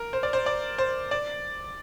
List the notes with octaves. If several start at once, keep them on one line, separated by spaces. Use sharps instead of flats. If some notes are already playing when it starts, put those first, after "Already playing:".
Already playing: A#4
C5
D5
C5
D5
C5
D5